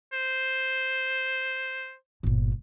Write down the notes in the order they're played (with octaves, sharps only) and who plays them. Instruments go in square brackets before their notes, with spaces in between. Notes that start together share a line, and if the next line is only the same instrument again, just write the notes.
[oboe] C5
[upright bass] G1 A#2